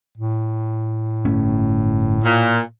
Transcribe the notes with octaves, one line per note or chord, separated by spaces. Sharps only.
A2
G1 A3 C#4
A#2